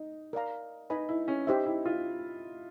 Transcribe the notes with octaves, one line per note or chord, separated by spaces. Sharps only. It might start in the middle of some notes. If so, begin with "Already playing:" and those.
Already playing: D#4
A#4 D5 F5 A#5
D#4 B4 D#5 G#5 B5
E4
C#4
D#4 G4 C5 E5
E4
F4